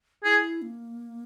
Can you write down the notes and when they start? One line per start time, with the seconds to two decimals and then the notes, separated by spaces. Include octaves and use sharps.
0.24 E4 G#4
0.62 A#3